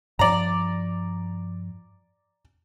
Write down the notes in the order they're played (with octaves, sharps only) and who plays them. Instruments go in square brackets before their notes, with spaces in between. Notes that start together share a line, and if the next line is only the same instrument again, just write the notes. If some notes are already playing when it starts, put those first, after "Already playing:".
[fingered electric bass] G2 F3 [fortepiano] D5 A#5